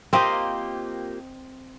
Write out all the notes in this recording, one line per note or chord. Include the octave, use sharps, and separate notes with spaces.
A#3 C4 F4 G4 D#5